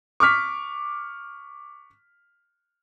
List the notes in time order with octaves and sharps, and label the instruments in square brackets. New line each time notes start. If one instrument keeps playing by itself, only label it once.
[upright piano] C#6 D6 F6 B6